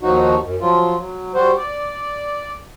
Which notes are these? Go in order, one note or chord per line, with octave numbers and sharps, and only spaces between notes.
D#2 F3 F#3 D#4 F#4
F#2
F3 F#3 F4
F#3
G3 F#4 C5
D5